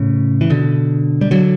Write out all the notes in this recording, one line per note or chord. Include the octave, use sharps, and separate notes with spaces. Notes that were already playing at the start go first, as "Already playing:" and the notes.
Already playing: A2 C#3
E3
B2 D3
G3
D3 F#3